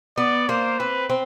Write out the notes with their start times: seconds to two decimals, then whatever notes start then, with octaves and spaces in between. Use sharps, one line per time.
0.18 B3 D5
0.49 A#3 C5
0.79 C4 B4
1.10 C4